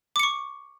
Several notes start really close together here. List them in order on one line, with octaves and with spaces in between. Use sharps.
D6 C#7 C#6